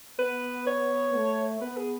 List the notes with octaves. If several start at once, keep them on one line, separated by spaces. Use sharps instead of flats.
B3 B4
C#5
A3
B3 B4
G#4